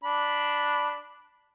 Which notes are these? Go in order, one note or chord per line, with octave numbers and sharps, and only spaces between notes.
D4 B5